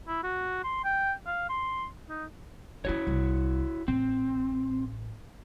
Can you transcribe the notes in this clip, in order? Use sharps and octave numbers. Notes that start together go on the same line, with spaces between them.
E4
F#4
C6
G5
F5
C6
D#4
C#4 D4 E4 F#4 C#5
C2
A1 A2 C4